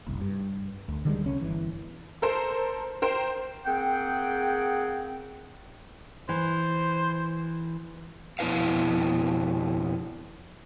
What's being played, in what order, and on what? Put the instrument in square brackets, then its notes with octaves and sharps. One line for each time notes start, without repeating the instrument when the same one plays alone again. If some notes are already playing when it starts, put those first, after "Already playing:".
[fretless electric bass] F#1 C2
G2
D2
D3 D#3 G3 G#3
C2 C#4
G1 E3
[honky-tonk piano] A4 A#4 C5
A#4 C5 G5
[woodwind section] A#3 C4 G#4 F#5 G5
[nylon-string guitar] E3 [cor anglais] C5
[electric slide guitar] F2 B2 E4 B4 F5